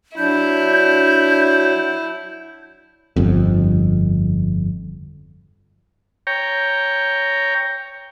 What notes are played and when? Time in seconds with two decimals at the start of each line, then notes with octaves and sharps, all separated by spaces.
0.17 F#3 D4 E4 G6
3.16 G1 F2
6.27 C#5 G5 A#5